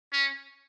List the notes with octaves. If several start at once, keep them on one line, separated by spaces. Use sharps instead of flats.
C#4